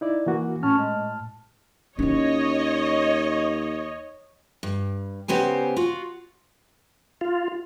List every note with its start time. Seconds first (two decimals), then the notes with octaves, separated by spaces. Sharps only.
0.01 D#4 E4 D5
0.26 E3 A#3 F#4
0.63 A2 C#4 A5 F6
0.78 G#3
1.99 D#2 C#4 E4 C#5 D#5
4.63 G2
5.28 C#3 B3 G4 C5 G#5
5.76 F4 F#4
7.21 F4